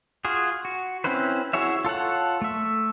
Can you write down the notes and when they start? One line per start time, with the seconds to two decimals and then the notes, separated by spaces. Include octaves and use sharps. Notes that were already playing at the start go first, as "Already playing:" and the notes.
0.25 F4 F#4 G#4
0.65 F#4
1.04 C4 C#4 E4 B4 C5
1.53 E4 F#4 G#4 C#5 E5
1.85 F4 A4 C#5 F#5
2.42 A3 E5